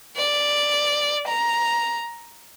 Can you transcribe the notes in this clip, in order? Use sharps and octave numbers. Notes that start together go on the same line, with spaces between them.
D5
A#5